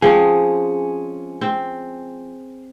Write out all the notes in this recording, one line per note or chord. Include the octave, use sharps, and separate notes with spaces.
F3 G#3 C4 C#4 G#4
C4